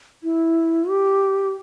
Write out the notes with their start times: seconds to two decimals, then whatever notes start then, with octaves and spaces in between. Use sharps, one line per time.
0.23 E4
0.89 G4